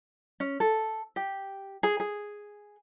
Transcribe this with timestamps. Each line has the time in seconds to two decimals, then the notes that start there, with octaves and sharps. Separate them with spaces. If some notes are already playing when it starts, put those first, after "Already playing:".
0.40 C#4
0.60 A4
1.16 G4
1.83 G#4
2.00 G#4